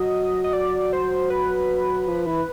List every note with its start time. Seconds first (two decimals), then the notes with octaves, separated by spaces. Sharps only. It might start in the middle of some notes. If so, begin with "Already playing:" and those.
Already playing: F#3 D#5
0.44 D#5
0.53 D5
0.93 C5
1.30 B4
2.07 F3
2.27 E3